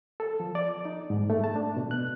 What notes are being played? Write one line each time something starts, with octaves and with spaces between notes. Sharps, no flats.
A4
F3
D5
D#4
G#2
A3
A5
D4
B2
F#6